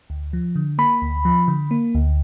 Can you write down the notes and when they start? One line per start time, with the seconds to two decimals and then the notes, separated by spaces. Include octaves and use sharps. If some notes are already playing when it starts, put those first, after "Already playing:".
0.10 D2
0.33 F3
0.56 D3
0.78 A#3 B5
1.02 D2
1.25 F3
1.48 D3
1.71 A#3
1.95 D2